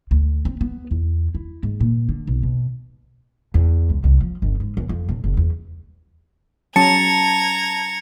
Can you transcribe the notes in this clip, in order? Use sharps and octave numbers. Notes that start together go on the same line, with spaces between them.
D2
C4
B3
E2
E4
G#2
A#2
D3
B1
B2
E2
C#2
C2
F3
G1
G#2
D#2
F2
D#1
F#1
E2
F#3 C#4 A5 A#5 G#6 C#7